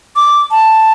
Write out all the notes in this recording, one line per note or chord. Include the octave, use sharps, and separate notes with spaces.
D6
A5